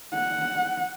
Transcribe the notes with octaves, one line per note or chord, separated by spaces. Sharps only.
F#5